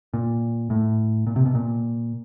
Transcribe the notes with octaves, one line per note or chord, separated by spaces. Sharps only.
A#2
A2
A#2
C3
B2
A#2